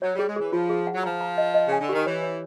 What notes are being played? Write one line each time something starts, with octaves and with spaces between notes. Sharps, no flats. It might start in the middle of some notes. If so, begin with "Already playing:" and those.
F#3 C#5
G3
G#4
G#3
E3 G#4
F3 F4
G#4
F#5
F#3
F3 A#5
A#5
D#5
D#5
C#3 G#5
D3
D#3 G4
E3 C#5
C#5